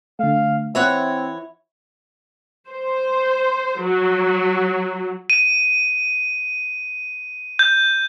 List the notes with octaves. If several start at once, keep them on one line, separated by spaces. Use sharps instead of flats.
D3 A3 F5
E3 C4 C#5 E5 F#5
C5
F#3
D#7
G6